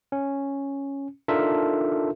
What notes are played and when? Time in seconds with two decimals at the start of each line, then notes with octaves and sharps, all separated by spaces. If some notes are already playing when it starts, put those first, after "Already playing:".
0.12 C#4
1.28 D4 D#4 F4 A4 A#4 E5